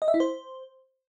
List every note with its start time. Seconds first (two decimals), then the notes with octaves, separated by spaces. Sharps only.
0.02 D#5
0.08 E5
0.14 E4
0.20 C5